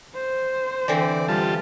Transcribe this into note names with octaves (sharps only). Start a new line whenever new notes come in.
C5
D3 E3 C4 D5
G3 F4 A5